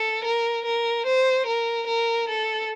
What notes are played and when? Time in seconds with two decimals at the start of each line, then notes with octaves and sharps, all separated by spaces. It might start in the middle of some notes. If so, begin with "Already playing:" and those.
Already playing: A4
0.24 A#4
0.65 A#4
1.06 C5
1.47 A#4
1.87 A#4
2.29 A4